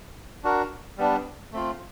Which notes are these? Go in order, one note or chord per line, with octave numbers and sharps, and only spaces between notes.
D4 F#4 A#4
G3 B3 D4
A3 C4 F4